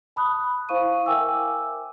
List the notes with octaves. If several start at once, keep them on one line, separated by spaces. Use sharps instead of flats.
A5 B5 D#6 F#6
E4 C5 F5 C#6 D#7
A#4 E5 G5 G#5 D6 E6